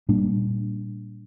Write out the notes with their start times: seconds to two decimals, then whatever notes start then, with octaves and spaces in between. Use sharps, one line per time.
0.09 A#2 G3 A#3 D4